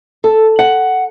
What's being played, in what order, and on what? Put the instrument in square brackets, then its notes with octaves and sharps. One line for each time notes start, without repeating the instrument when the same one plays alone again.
[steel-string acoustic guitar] A4
F#5